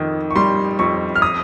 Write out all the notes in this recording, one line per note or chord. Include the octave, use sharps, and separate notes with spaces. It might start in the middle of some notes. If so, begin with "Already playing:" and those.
Already playing: F2 D#3
C#6
G3 C6
F2 C#6
F6
D#6